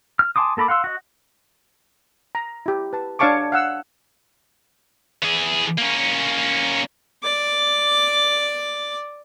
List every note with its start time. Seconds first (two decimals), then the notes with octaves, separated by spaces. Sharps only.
0.19 F6
0.36 G#5 A5 C6 D6 D#6
0.57 A#3 A4 A#5 B5 D6
0.68 F5 F#5 C6 E6
0.84 F#4 D#5
2.35 A#5
2.66 E4 G4
2.93 B4 A5
3.19 D4 C#5 F5 A5 C#6 D6
3.52 F5 F#5 E6
5.23 E3 G#4
5.78 A#3 C#4
7.23 D5 D6